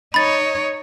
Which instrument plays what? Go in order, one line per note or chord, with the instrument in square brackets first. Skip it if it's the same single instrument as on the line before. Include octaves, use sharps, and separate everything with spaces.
[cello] D#4 C#5 [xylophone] B5 A6